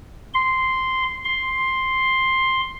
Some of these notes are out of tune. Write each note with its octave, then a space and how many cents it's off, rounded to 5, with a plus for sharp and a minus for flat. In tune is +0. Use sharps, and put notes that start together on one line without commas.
C6 -5
C6 +5